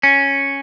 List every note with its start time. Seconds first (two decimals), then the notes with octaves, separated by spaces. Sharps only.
0.03 C#4